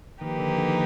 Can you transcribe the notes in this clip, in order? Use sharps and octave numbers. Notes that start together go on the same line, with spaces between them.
D#3 F3 A#3 D#4 G4 B4
D3
D3
D#3